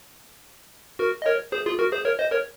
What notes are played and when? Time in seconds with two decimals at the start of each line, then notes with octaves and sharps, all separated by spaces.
0.99 F#4 A#4
1.22 D#5
1.26 A#4 C#5
1.52 G#4 C5
1.66 F4 G#4
1.79 F#4 A#4
1.92 G#4 C5
2.05 A#4 C#5
2.19 C5 D#5
2.31 A#4 C#5